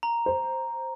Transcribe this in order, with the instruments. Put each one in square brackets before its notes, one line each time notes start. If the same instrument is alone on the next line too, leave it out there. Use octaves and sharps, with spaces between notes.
[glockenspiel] A#5
[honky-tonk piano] C5